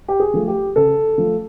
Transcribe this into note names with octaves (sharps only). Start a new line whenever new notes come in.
G4
G#4
F3 A3
G4
C#3 A4
F3 A3